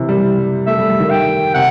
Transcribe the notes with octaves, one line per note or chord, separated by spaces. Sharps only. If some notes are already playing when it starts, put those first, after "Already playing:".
Already playing: C3 E3
G3
A3 E5
G3
G3
D#3
G5
C3 F#5